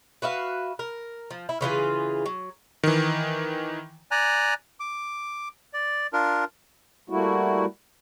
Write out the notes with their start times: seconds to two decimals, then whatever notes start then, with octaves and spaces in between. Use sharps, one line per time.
0.22 F#4 B4 E5 F5
0.79 A#4
1.31 F3
1.49 E4
1.61 C#3 E3 F4 G#4
2.26 F#3
2.83 D#3 E3
4.11 D5 G#5 A#5 F#6
4.80 D6
5.73 D5
6.13 D4 F4 A#4
7.10 G3 A3 A#3 E4 F#4